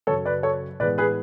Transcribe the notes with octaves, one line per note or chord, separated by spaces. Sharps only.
F#2 C#3 F#3 A4 C#5
B4 D5
A4 C#5
A2 E3 G#3 B3 B4 D5
G#4 B4